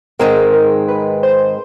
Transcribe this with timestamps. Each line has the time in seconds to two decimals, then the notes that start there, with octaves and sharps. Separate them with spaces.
0.19 G#2 D#3 G#3 C4 A#4
0.54 A#4
0.88 B4
1.23 C5